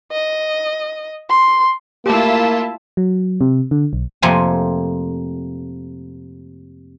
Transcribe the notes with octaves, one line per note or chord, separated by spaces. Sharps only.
D#5
C6
A3 A#3 E4 F4 G4 A5
F#3
C3
D3
B1
F2 C3 A3 A#3 C5 G#5